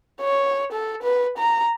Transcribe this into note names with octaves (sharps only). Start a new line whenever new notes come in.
C#5
A4
B4
A#5